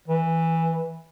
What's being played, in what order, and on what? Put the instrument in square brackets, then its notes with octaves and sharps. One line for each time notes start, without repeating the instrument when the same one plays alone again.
[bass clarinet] E3